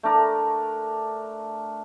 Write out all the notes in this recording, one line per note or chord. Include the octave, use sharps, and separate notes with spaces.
A3 D4 A#4